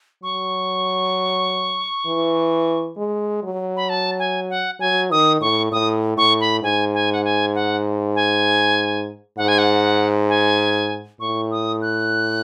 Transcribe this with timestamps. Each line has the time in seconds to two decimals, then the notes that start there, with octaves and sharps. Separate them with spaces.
0.23 F#3 C#6
2.06 E3
2.97 G#3
3.43 F#3
3.77 B5
3.89 A5
4.19 G#5
4.49 F#5
4.80 F#3 G#5
5.11 D#3 D#6
5.41 A2 C#6
5.72 A2 D#6
6.17 A2 C#6
6.41 B5
6.63 G#2 G#5
6.94 G#5
7.12 F#5
7.24 G#5
7.55 F#5
8.15 G#5
9.37 G#2 F#5
9.48 G#5
9.58 F#5
10.29 G#5
11.20 A2 C#6
11.51 D#6
11.82 F#6